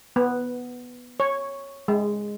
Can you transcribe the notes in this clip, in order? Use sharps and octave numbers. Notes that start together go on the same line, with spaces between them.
B3
C#5
G#3